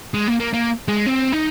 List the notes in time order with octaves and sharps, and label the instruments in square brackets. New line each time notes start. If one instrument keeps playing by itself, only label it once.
[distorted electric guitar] G#3
A#3
A#3
A#3
G#3
C4
D#4